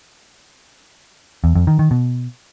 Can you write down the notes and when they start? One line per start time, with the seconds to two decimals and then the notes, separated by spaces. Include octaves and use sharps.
1.44 E2
1.55 F2
1.67 D#3
1.79 D#3
1.91 B2